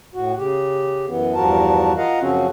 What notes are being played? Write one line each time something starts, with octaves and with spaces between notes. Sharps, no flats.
A2 F#4
C#3 G4
F#2 E3 B3
E2 G2 F3 F#4 A#4 A5
F4 A#4 D#5 F5 F#5
F#2 C#3 F3 C4 C#4 F#4